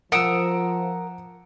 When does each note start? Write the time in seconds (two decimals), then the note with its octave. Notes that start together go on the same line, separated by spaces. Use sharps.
0.12 F3 A#4 F#5 D#6 E6 C#7 D7